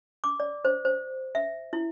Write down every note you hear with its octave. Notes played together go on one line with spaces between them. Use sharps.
D6
D5
C5
C5
E5
E4